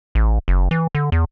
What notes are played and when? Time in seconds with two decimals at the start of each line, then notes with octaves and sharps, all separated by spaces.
0.15 A1
0.48 F#1
0.71 E3
0.95 D3
1.12 E2